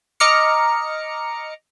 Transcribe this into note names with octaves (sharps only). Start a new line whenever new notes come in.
D#5 A#5 D6 F6 C#7